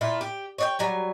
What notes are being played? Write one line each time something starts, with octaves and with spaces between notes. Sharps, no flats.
A#2 E4 F4
G4
C#5 D5 G5
F#3 G3 G#5